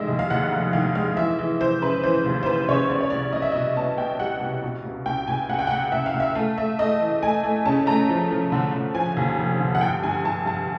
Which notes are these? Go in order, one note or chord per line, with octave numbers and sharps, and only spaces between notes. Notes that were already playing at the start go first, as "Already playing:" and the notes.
Already playing: F1 D#3 G#3 D#5 E5
D#2
F5
D#2 F#5
F1
D#3 F5
G#3 F5
E3 E5
E3
E3 C5
C#3 B4
E3 C5
D#2
C5
E3 B4
C#3 C#5
B3 D5
C#5
C2 D5
C2 D#5
E5
D#5
B2
B3 A5
B3 G5
G3 F#5
C2
B2
C#2
C#2 G5
C#2 G#5
C#2 F#5
G5
F#5
C#2
C#2 E5
F5
C#2
E5
A3 F5
A3 E5
A3 D#5
E3
A3 G#5
A3
C#3 A5
A3 A#5
F3
F3
D3
D3
F3 G#5
D#2
F1
D3
F#5
G2 G5
G2 G#5
G2 A5
G2 A5